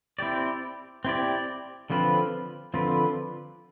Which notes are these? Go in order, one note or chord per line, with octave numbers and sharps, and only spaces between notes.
C4 E4 G4 D5
C4 E4 G4 D5
D3 F3 C4 F4 B4
D3 F3 C4 F4 B4